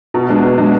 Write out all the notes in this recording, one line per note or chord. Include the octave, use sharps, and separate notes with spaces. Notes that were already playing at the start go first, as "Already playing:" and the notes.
B2
G#3 B3 D4
B2
G#3 B3 D4